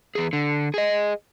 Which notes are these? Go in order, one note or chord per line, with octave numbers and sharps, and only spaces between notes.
E2 G#4
D3
G#4 D#5